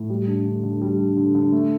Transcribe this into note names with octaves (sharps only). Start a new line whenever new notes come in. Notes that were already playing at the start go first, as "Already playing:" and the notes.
Already playing: A2
G3
D4
D3
D3
G3
D4
D3
D3
A3